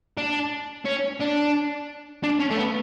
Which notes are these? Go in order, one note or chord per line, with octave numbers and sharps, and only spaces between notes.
D4
C#4
D4
D4
C#4
A3
B3